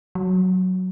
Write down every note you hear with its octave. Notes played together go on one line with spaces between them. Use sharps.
F#3